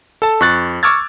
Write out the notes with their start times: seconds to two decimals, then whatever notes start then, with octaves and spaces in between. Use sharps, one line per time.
0.22 A4 A5
0.40 F2 C#6 F#6 A6
0.83 C#6 D6 E6 F6 G#6 A6